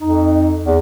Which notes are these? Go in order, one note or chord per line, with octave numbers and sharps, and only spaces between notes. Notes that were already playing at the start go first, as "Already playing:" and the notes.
F2 D#4
E2